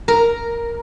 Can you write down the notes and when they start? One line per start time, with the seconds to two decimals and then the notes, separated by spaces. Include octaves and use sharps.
0.08 A#4